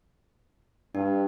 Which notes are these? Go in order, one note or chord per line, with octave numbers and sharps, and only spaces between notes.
G2 D4